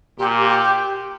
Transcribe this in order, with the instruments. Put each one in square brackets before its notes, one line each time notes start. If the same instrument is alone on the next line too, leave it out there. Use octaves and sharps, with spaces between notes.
[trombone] A#2 [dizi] G4
[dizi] G4